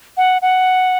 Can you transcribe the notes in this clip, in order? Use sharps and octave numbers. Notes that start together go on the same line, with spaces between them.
F#5
F#5